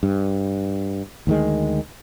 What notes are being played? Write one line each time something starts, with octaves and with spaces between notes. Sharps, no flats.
G2
D2 D#3 G#3